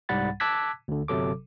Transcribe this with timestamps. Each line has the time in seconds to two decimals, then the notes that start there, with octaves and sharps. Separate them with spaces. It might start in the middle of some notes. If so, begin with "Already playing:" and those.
0.09 C2 G#2 G3 F#5 B5 A6
0.40 A5 D6 E6 F#6 G#6 B6
0.88 D2 D3
1.08 G1 C3 F#3 A4 D6